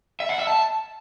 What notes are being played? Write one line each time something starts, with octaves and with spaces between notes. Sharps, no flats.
E5
F#5
E5
A5